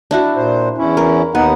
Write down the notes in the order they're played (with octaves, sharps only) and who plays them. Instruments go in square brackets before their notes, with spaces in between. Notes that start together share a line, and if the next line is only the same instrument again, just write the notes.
[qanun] D4 E4 F#4
[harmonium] A#2 C5
E2 C#4 E4
[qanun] A#4
[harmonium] D#2 D#4 F#5 [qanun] B3